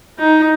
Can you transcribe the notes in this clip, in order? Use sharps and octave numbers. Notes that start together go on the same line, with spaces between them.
D#4